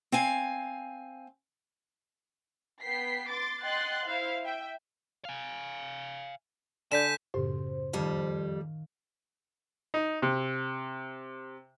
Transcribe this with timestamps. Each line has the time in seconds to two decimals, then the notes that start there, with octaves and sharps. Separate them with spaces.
0.12 C4 F5 G#5
2.81 B3 G5 B6 C7
3.30 C6 D6 A6
3.64 D#5 F#5 G5 C6 F#6 A6
4.07 E4 C5 F5
4.44 E5 G5
5.25 F5 G#5
6.92 D3 D5 G#5 G6 B6 E7
7.34 F#2 A2 C#3 G4 C5
7.93 F2 D#3 G3 F5 D7
9.94 D#4
10.22 C3